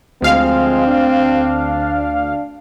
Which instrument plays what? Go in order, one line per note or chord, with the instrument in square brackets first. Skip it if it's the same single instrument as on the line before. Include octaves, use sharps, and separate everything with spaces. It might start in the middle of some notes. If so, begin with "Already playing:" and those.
[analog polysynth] D2 F5 [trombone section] F3 G#3 [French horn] C4
[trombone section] D4